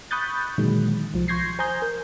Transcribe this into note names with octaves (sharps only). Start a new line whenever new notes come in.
B5 C#6 D#6 F#6 G6 A6
A#2 D3 D#3 F#3 G#3
C2 F3
C6 C#6 G6 G#6 A#6 C7
C5 G#5 A#5 D#6 G6
A#4